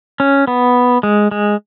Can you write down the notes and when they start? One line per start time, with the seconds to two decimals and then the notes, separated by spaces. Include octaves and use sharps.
0.20 C#4
0.47 B3
1.03 G#3
1.31 G#3